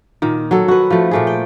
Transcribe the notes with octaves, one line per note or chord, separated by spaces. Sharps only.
A#2 D#3
F#3 A4
F#4 B4
F3 A3
A#2 A3 G#4
G5